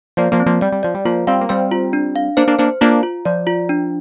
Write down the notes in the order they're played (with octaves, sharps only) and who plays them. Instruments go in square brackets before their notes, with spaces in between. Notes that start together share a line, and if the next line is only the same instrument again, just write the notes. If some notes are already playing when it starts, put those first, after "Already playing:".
[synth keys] F3 A#3 [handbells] D5
[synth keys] F3 A#3
[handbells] C4
[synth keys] F3 A#3
[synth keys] G3 [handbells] D5
[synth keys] G3
[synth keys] F3 [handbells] D5
[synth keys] G3
[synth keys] F3 A#3 [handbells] F4
[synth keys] G3 C4 [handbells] F5
[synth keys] A#3
[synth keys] G3 C4 [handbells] C5
[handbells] F4
D4
F5
[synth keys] A#3 D4 [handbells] C5
[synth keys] A#3 D4
[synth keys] A#3 D4 [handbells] C5
[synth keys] A#3 D4 [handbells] F4
[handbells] F4
[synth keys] F3 [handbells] D5
[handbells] F4
D4